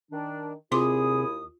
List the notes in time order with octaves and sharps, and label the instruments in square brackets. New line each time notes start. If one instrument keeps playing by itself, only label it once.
[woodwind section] D#3 D4
[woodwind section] D#2 E4 D#6 [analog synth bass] C3 [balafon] F4 C6 D6 [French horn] G#4